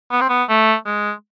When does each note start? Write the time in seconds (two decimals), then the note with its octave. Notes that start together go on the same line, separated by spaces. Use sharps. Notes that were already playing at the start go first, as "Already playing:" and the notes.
0.12 B3
0.21 C4
0.29 B3
0.49 A3
0.86 G#3